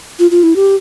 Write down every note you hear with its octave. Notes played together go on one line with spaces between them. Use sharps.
F4
F4
E4
G4